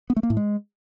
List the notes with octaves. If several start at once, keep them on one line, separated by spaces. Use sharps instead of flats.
B3
A3
A#3
A2
G#3